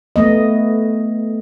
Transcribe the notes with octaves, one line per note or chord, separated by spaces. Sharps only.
A3 B3 D#5